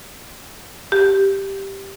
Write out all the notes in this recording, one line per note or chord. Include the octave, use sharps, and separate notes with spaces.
G4